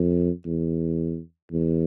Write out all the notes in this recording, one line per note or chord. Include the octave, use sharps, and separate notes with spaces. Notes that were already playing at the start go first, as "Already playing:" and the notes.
Already playing: F2
E2
E2